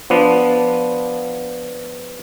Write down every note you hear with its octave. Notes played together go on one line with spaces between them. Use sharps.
F3 B3 D4